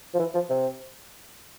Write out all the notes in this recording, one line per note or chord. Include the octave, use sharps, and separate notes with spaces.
F3
E3
F3
C3